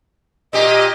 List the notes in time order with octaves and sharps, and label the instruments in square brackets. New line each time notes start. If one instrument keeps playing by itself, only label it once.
[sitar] A#2 G4 [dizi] D#5